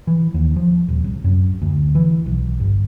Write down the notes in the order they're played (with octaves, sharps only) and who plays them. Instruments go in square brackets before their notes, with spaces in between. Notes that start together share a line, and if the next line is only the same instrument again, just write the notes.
[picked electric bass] E3
D#2
F3
D#1
C2
F#2
D2
E3
B1
G1